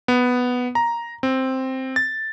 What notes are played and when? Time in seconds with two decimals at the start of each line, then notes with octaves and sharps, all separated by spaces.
0.08 B3
0.75 A#5
1.23 C4
1.96 A6